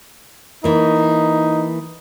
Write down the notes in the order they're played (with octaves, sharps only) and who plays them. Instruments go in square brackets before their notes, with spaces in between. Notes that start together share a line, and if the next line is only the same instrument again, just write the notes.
[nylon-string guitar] E3 A#3 [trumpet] D#4